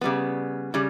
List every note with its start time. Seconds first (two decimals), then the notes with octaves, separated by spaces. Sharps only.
0.01 C#3 G3 B3
0.74 C#3 G3